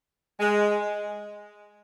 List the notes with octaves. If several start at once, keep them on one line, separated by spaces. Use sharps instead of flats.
G#3